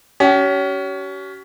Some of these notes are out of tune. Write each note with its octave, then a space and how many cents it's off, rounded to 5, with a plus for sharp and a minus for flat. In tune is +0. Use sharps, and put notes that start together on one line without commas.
C#4 +25 G4 -45